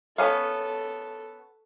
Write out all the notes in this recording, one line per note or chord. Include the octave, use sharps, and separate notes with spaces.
B3 C#4 A4 F5